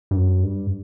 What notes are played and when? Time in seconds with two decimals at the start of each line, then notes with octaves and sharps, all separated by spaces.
0.11 G2
0.16 F#2
0.44 G2